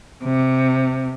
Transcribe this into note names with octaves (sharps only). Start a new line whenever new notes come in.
C3